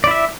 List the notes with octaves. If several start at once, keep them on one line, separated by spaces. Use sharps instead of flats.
E4 D5 E5